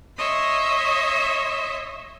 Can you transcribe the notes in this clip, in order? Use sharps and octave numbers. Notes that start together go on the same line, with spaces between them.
C#5 D#5 E5 C6